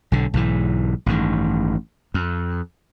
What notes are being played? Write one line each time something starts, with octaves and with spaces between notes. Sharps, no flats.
B1 D3
B1 G#2 E3
A1 G2 D#3
F2